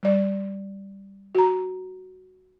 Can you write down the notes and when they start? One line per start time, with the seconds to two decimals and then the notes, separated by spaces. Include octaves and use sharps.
0.03 G3 D5
1.35 F#4 A#5